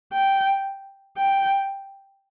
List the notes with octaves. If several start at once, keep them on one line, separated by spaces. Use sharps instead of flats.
G5
G5